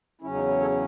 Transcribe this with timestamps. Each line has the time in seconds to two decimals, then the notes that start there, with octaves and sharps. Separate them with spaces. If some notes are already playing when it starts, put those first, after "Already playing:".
0.21 E2 C#3 F#3 C#4 E4
0.34 D#4
0.48 E4
0.60 A4 C#5